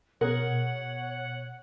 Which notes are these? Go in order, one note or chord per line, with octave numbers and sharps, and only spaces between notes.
B2 G#4 A#4 C#5 F#5